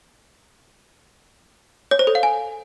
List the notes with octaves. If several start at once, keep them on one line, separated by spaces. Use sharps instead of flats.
C#5
C5
A4
F5
G#5